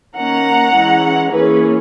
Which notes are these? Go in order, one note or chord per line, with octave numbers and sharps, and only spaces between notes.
D#3 A#3 C#4 F#5 A#5
E3 G#3 C#4
E3 A#3 C#4 G#4 B4